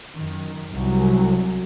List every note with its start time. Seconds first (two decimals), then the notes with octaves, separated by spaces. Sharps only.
0.15 F#2 D#3
0.73 C2 F#3